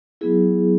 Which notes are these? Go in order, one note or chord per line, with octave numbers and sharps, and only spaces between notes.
F#3 B3 E4 G#4